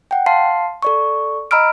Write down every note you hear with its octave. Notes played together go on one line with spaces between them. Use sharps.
F#5 G5
F5 A5 C6 C7
A4 D5 C#6
D#5 A#5 B5 E6 F6 D7